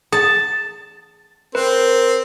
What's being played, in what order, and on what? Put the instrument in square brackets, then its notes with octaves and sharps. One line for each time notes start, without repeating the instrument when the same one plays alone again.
[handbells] G#4 [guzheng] A5
[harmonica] C4 [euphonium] A#4 [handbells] B4